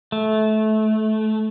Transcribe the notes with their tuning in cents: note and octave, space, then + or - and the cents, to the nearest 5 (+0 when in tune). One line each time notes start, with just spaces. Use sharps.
A3 -20